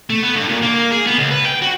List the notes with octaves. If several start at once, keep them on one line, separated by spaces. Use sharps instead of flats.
A3
B3
G2
A#2
A#3
G#4
B3
C#2
B4
G5
F#4